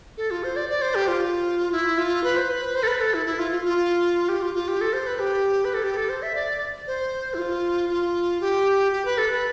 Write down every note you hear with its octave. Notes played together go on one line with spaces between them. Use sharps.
A4
F4
C5
D5
D5
C5
G4
F4
E4
F4
B4
C5
B4
C5
A4
B4
A4
E4
E4
F4
F4
F4
G4
F4
F4
G4
A4
C5
B4
G4
B4
A4
G4
A4
C5
E5
D5
C5
E4
F4
F4
G4
G4
B4
A4
B4